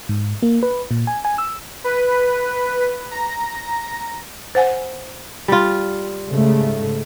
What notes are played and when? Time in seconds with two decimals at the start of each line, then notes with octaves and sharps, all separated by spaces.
0.09 G#2
0.42 A#3
0.63 B4
0.91 A#2
1.07 G#5
1.25 G#5
1.38 E6
1.84 B4
3.11 A#5
4.55 C5 F#5 G#5
5.48 G3 F4
6.29 G#2 C#3 A3